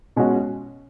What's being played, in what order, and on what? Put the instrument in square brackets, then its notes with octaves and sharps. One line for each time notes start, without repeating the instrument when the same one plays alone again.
[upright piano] B2 G#3 C#4 F#4